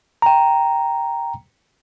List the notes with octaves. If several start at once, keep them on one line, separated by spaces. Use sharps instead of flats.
G5 A#5